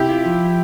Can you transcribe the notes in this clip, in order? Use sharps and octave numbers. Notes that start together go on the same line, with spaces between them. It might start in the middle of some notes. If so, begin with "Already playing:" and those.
Already playing: C3 E4 G4
F4
F3